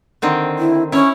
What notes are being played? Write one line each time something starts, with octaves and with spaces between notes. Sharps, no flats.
D3 D#3 C4
E4
C#4 E4 C#5